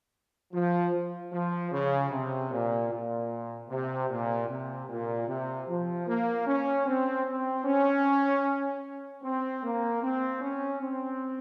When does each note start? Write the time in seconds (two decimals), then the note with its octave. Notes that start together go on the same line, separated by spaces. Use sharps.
0.53 F3
1.32 F3
1.72 C#3
2.11 C3
2.51 A#2
2.90 A#2
3.69 C3
4.09 A#2
4.48 C3
4.88 A#2
5.27 C3
5.68 F3
6.07 A#3
6.47 C#4
6.86 C4
7.26 C4
7.65 C#4
9.23 C4
9.63 A#3
10.02 C4
10.42 C#4
10.82 C4